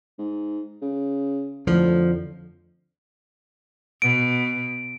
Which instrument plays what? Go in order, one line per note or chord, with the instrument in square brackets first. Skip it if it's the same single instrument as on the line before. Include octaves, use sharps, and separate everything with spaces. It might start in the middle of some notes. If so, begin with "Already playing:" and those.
[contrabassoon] G#2
C#3
[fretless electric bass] F2 D3 [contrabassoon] A2 [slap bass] F3
[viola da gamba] B2 [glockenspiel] D7